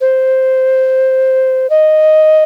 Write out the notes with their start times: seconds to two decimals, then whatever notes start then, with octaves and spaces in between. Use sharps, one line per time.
0.01 C5
1.70 D#5